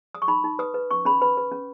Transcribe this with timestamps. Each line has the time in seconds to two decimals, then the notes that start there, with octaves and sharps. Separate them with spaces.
0.15 D#6
0.22 C#6
0.28 D#4 B5
0.44 D#4
0.59 B4 D#6
0.74 B4
0.91 C#4 C#6
1.05 C#4 B5
1.21 B4 B5
1.37 B4
1.51 C#4